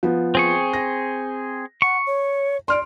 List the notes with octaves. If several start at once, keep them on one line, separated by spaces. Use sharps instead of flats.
F3 B3
C4 G#4 C#6
A#6
F#5 C#6
C#5
D5 C6 F6 D7